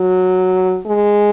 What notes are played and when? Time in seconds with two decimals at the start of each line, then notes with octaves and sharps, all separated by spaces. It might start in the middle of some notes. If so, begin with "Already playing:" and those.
Already playing: F#3
0.87 G#3